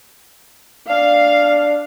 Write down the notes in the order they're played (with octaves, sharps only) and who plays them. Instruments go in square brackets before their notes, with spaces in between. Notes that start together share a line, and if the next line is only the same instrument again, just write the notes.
[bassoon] D4 [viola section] F5